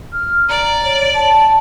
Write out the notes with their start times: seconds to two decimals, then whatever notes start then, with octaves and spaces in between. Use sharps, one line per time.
0.13 F6
0.49 D5 A#5
0.84 C#5
1.14 A5